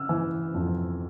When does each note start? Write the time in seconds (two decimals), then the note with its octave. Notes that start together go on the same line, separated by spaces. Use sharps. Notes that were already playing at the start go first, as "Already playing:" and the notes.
Already playing: C#3 E6 F6
0.09 E3
0.54 F2